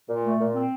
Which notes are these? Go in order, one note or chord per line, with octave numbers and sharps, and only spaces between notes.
A#2
A3
A#2
C4